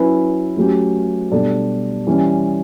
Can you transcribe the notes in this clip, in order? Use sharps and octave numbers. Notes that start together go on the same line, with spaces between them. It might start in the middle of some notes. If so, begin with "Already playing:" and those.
Already playing: F#3 C#4 E4 B4
F#3 A3 C#4 G4
B2 G3 D4 A4
E3 G3 C#4